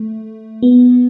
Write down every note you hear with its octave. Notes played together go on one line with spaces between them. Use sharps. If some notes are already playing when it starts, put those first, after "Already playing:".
Already playing: A3
B3